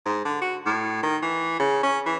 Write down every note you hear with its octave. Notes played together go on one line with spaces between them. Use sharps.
G#2
D3
F#4
A2
D#3
E3
C#3
C#4
E3